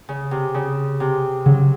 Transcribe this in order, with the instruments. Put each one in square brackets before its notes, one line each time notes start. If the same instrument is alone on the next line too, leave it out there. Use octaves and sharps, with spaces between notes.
[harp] C#3
C3
C#3
C3
[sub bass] C#3 [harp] F#3